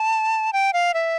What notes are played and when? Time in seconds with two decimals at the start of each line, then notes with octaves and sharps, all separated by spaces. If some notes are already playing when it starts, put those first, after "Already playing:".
Already playing: A5
0.53 G5
0.73 F5
0.94 E5